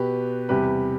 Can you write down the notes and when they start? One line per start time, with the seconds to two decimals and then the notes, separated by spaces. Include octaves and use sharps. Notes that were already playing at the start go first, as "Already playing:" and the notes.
Already playing: B2 B3 G4 B4
0.49 E2 C3 G3 B3 G4 B4